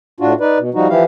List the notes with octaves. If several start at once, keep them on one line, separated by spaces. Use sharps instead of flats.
A2 D4 F4 F#4
D#4 B4 D5
B2
F3 G3 D#4 F#4
E3 F3 E4 G4 F5